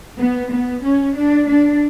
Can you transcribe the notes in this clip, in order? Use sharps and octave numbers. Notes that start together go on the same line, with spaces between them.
B3
B3
C#4
D4
D4